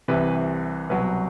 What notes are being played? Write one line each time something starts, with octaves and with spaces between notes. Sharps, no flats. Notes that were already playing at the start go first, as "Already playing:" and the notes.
C2 C3 E3 B4
C2 B2 F#3 B4